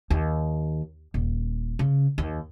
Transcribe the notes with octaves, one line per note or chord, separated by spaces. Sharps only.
D#2
D#1
C#3
D#2